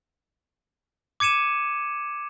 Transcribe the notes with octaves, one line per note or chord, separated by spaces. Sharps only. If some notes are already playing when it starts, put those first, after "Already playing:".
D6 G#6 C#7 D#7 E7